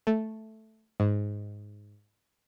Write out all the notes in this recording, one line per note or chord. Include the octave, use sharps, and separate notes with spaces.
A3
G#2